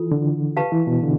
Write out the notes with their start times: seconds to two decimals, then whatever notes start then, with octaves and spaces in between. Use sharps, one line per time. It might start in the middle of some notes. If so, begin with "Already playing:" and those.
Already playing: E3 F4 A4
0.11 D3
0.57 G4 B4 F5 A5
0.72 E3
0.87 B2
1.03 D3